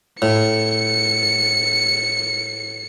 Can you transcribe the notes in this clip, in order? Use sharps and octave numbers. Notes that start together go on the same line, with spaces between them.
A2 C#7